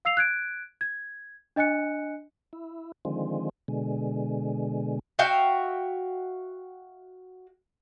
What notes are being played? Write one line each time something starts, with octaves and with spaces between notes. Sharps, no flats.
F5 E6 C7 F7
F#6 G#6 D7
G#6
D4 D#5 G#5 F#6 C#7
E4
D3 D#3 F3 G#3 C4
B2 D3 G#3
F#4 E5 F5 G5